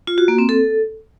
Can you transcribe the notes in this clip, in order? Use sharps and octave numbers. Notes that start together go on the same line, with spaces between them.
F4
F#4
A#3
C4
A4